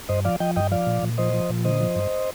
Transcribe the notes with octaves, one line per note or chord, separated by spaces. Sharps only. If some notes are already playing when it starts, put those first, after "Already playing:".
G2 C5 D#5
F3 D5 F5
F3 D#5 G5
G2 D#5 G5
F3 D5 F5
A#2
A#2
F3 C5 D#5
F3
A#2
D3 C5 D#5
F3
G2